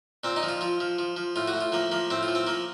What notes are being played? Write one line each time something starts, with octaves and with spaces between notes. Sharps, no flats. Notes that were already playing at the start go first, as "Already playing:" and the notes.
A#2 C4
D#4
F3
F4
F3 F4
F3
F3
F3
A2 F4
F#4
A2
F4
F3 A#3
F3 A#3
A2 C4
F4
F3
C4
F3 A#3